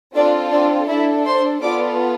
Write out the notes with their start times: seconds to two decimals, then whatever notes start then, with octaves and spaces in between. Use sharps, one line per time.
0.16 C4 D4 F4 A4 D5
0.52 D4 D5
0.89 D4 E4 A4 E5
1.26 C5 C6
1.62 B3 F4 A4 D5 D6